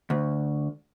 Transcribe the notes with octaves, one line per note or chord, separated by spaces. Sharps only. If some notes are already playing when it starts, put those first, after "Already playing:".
D2